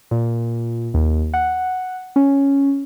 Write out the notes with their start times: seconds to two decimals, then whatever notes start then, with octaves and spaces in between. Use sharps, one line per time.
0.11 A#2
0.94 D#2
1.34 F#5
2.16 C#4